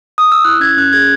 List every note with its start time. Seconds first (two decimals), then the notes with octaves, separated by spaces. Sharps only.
0.18 D#6
0.32 E6
0.45 E4 F#6
0.60 C#4 G#6
0.77 C#4 F#6
0.93 G#4 G#6